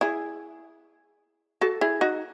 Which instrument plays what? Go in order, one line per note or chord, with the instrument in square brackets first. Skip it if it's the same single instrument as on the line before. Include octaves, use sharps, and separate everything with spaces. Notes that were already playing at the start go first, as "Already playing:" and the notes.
[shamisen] E4 G#4
F#4 A4
E4 G#4
D#4 F#4